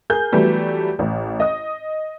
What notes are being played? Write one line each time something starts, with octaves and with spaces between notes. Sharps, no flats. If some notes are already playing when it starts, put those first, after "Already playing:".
G#4 A#4 G6
E3 F#3 G3 A3 B3
A1
D#5 D#6